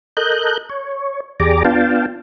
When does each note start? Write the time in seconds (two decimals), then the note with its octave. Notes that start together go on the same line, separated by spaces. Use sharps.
0.17 A4 A#4 D#5 F#6 G6
0.69 C#5
1.40 E2 G4 G#4 D5 A#5 D6
1.65 B3 D4 F4 F5 G5 A5